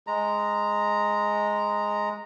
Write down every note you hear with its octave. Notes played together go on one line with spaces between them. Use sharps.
G#3 A#5